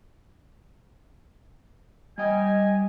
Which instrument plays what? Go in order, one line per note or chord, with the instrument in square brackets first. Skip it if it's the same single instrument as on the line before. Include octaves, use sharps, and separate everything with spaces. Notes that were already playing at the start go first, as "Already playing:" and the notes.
[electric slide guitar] G3 G5 [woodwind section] D#5 G#5